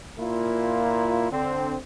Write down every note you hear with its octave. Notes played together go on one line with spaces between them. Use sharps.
A#2 A#3 E4 F4
D3 C4